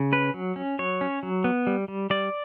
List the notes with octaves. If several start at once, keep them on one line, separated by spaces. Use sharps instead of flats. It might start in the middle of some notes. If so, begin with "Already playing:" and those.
Already playing: C#3
C#4 B4
F#3
C#4
F#3 C#5
C#4
F#3
B3
G3
G3
G3 D5